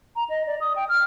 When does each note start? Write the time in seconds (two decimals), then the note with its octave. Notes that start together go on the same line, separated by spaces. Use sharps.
0.16 A#5
0.30 D#5
0.47 D5
0.61 D#6
0.76 G5
0.89 F6